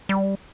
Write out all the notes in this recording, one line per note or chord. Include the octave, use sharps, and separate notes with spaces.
G3